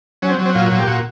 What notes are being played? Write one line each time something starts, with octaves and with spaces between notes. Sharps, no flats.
F#3 C#4
C4
F#3
C4
A#2 F4
A#2
G4
A#2 F#4